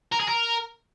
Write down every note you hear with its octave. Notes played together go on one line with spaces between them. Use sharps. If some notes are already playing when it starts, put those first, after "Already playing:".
A#4
G#4
A#4